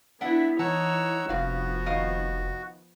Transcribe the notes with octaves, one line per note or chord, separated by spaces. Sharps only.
B3 D4 E4 E5 F#5
E3 D#4 C#5 F#5 A5 A#5 E6
F1 G2 F3 B3 F#4 F5
D#3 D#5 F5